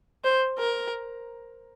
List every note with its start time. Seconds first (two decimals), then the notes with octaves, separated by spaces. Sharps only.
0.24 C5
0.59 A#4